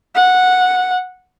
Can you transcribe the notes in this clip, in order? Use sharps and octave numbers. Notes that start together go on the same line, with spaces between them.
F#5